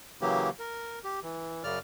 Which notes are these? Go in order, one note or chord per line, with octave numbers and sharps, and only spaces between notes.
C#3 E3 F#3 A#3 G4
A#4
G4
E3
F#2 C#3 D5 F6